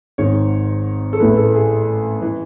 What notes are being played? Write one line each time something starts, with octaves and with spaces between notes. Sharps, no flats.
G#1 G#2 D#3 C#5
A4
A1 A2 E3 B4
A4
G#4
E3